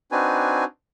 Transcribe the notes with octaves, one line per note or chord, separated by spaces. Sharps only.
C4 D4 D#4 F#4 B4 G#5